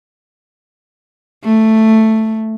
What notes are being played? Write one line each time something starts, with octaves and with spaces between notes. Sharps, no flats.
A3